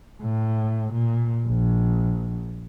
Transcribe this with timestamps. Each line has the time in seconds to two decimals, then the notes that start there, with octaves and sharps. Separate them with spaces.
0.22 A2
0.93 A#2
1.47 A#1